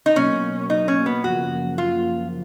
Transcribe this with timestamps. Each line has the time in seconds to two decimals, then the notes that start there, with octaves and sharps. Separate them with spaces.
0.06 D#4
0.16 B2 F#3 A#3 C#4
0.70 D#4
0.88 C#4
1.06 B3
1.24 F#2 C#3 F3 A#3 F#4
1.78 F4